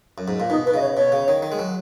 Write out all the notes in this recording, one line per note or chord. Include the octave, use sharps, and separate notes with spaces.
F#2
G#2
A#2
B2 D#4
B2 B4
C#3 D#5
C#5
B2 C#5
C#3
D#3
D#3
G#3
F#3